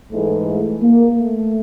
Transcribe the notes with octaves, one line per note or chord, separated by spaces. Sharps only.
G#2 E3 G#3 A3
A3
A#3
A3